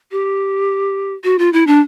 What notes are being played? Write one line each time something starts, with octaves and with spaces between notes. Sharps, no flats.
G4
F#4
F4
E4
D4